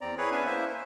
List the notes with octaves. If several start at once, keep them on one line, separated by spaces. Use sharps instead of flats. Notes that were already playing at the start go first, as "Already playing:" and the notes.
E2 C4 D5 A#5
E4 G#4 B4 C#5
B3 C#4 D4 B4 E5 G#5
A#3 E4 C5 E5
C5